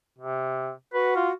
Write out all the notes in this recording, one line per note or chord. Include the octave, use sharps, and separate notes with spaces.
C3
F#4 B4
F4